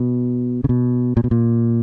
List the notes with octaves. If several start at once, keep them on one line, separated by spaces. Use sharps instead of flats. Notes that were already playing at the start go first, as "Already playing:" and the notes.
Already playing: B2
C#3
B2
A#2
B2
A#2